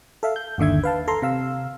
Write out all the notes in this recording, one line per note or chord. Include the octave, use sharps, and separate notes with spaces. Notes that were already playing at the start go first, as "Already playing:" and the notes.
A4 E5 F5
G6
G1 D#2 D3 E5 G#6
B4 F5 A5
A4 A#5 C6
C3 F5 E6